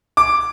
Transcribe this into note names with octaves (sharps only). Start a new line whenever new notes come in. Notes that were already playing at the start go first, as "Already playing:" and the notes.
D6